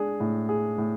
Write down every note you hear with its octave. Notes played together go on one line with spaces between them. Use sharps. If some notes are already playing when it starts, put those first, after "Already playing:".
Already playing: G#3 D4 G#4
A2
G#4
A2